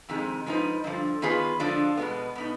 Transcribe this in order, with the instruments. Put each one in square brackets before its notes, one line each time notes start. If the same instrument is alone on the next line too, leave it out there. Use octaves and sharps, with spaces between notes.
[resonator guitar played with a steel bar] F2 C3 D#3 G#3
G#2 F3 C4 D#4 B4
G2 D3 F3
D#3 B3 F4 G#4 B4
D3 F3 G#3 D4 F4
B2 G#3 B3
B2 B3 D#4